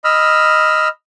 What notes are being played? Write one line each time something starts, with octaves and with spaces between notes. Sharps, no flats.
D#5 B5 E6 F6